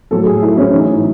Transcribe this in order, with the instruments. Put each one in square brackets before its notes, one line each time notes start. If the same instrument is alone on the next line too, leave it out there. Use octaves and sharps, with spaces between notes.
[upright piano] A2 F#3 A4
G#4
E4
C#4
A2 E3 D#4